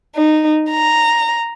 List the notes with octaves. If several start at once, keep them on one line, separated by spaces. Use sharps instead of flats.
D#4
A#5